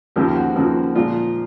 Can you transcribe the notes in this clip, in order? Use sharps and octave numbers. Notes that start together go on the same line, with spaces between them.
D#2 C#3 F3 A#3 G4
F#4
D#2 C#3 F3 A#3
A#2 F3 G#3 F4